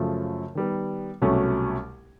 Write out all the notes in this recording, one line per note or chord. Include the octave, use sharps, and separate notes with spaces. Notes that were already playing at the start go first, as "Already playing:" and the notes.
Already playing: F#2 C#3 F3 A3
D#3 G3 B3
C2 B2 F#3 A3 C#4